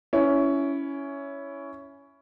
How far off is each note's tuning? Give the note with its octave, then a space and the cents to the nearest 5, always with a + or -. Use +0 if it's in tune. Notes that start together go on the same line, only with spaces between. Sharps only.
C#4 +10 E4 +0